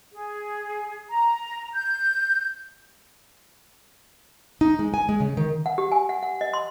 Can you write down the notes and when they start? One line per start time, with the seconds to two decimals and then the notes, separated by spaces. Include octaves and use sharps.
0.13 G#4
1.10 A#5
1.73 G6
4.61 D#4
4.79 G#3
4.94 G#5
5.09 G#3
5.20 C#3
5.37 D#3
5.66 F#5
5.78 G4
5.92 G#5
6.09 F#5
6.23 F#5
6.41 D#5
6.54 C6